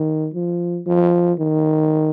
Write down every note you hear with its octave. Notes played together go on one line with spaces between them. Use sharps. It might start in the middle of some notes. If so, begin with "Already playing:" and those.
Already playing: D#3
F3
F3
D#3